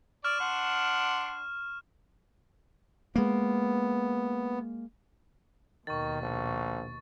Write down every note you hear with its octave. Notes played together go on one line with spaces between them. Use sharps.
D5 C#6 F6 E7
D4 F#5 C6
G#3 A#3 B3
D#2 B2 D#3 C#6 A6
A#1